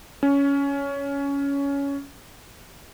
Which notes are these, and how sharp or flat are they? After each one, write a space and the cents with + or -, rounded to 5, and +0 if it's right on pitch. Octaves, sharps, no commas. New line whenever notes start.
C#4 +15